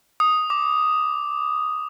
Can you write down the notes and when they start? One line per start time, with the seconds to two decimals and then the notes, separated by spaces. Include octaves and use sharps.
0.20 D#6
0.50 D6